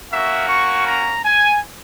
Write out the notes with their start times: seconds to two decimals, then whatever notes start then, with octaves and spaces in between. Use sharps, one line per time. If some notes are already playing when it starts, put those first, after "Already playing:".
0.11 A#3 C#4 F#4 E5
0.49 C#6
0.87 A#5
1.25 G#5